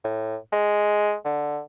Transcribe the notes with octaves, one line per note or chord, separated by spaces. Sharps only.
A2
G#3
D3